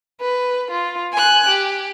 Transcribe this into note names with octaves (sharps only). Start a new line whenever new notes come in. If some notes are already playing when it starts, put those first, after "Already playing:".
B4
F4
G#5 F#6
G4